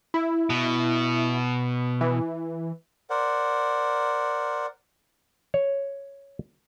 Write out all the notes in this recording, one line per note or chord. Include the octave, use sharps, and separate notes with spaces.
E4
B2
E3
A#4 C5 D5 F#5
C#5